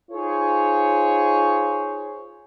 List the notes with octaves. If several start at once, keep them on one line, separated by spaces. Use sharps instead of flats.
D#4 F4 G#4 C5 C#5